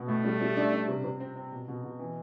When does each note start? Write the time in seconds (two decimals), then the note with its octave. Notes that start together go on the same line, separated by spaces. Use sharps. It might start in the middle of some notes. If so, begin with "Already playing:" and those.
Already playing: B2
0.08 A2 A3
0.25 G3
0.41 G3
0.57 D4
0.73 D4
0.88 C3
1.04 C3
1.20 C4
1.36 C4
1.52 B2
1.68 B2
1.84 B2
1.99 E3